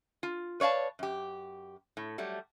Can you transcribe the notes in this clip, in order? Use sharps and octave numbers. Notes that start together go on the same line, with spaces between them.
F4
B4 C#5 D5 F5 A5
F#2 G4
A2
F#3 G3 A3